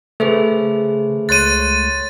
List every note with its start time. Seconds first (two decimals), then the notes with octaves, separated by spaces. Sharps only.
0.20 C#3 A3 G#4 B4 C5
1.29 C#2 C#5 C6 F#6 A6 D#7